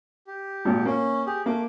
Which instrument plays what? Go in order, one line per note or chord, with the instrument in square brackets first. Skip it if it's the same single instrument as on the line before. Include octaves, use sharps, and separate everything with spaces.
[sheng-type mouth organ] G4
[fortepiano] G#1 A#2
[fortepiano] A#3 [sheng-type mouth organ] C#4
[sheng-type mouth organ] G4 G#4
[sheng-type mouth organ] A3 D6 [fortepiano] A#3